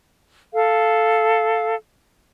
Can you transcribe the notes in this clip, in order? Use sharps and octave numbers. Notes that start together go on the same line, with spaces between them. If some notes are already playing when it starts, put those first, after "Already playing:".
A4 F5